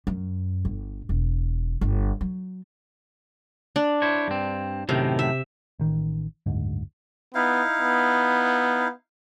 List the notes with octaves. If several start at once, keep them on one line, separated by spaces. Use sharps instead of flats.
F#2
G1
E1
G1
F#3
D4
E4 C5 C#5
G2 C4
F#2 A2 C3 D#3
E5
A1 D#3
F#1 D2 G#2
B3 D#4 E4 F5
B3